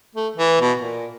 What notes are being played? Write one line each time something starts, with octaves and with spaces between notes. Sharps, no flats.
A3
E3
B2
A#2